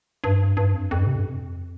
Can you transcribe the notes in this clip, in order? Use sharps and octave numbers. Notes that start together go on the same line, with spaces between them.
G2
G2
F2
F2
G2
C3
G2
F2